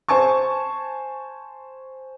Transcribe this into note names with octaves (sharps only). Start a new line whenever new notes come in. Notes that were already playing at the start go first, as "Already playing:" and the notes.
C5 G#5 A5 C#6